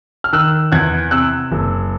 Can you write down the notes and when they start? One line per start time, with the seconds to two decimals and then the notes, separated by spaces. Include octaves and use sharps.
0.24 F6
0.33 D#3 E6 F#6
0.72 E2 F#6 G#6
1.11 C3 E6 F#6
1.52 F#1